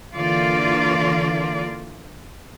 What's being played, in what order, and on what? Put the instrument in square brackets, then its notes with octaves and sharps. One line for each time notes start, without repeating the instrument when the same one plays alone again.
[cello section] D3 E3 A#3 F4 D5